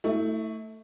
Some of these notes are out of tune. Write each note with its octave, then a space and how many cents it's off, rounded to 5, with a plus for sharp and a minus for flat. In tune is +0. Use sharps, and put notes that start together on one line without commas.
A3 +15 E4 -30